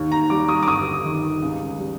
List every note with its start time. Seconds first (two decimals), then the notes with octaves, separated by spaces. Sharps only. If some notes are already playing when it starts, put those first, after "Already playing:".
Already playing: D#2
0.12 A#5
0.30 G3 D6
0.49 D#6
0.63 D6
0.68 G1 D#6
1.05 D#3
1.42 C#2
1.79 G3